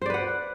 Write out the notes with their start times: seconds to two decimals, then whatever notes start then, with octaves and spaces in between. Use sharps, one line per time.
0.02 C5
0.06 D5
0.10 B4
0.14 F#5